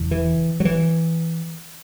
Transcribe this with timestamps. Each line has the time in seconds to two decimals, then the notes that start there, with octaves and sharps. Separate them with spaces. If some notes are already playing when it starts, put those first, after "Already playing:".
Already playing: E1 E2 C#3
0.11 E3
0.60 F#3
0.65 E3